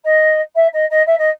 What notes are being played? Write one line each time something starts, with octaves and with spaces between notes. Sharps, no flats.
D#5
E5
D#5
D#5
E5
D#5